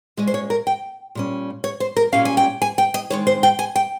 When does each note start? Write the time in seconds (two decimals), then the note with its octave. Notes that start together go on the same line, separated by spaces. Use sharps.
0.17 A#2 G#3 C#4 D#5
0.27 C5
0.34 C#5
0.50 A#4
0.67 G5
1.15 A#2 G3 C#4
1.64 C#5
1.80 C5
1.97 A#4
2.13 A#2 G3 A#3 C#4 F5
2.25 G#5
2.37 G5
2.62 G#5
2.78 G5
2.94 D#5
3.10 D#3 G#3 C4 C#5
3.27 C5
3.43 G5
3.59 G#5
3.76 G5